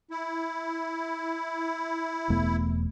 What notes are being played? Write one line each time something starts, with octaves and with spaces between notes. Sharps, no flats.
E4
E1 A3 B3